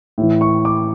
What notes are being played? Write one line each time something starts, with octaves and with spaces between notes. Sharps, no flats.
A2 E3
C#6
D6